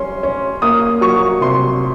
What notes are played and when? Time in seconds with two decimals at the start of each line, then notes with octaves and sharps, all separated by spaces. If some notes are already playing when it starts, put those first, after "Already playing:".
Already playing: C#4 C6
0.23 C#4
0.62 A#3 D#6
1.01 F#3 C#6
1.41 C3 C6